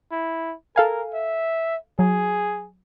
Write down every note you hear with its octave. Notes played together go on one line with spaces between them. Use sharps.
E4
A4 A#4 F5 G#5
E5
F#3 G#4